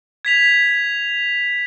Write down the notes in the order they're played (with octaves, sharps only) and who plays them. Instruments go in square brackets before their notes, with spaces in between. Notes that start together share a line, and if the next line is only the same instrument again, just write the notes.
[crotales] G#6 B6 F7